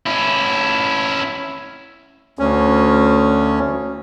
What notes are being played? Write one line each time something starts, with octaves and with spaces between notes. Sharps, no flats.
C#4 E4
D2 C#4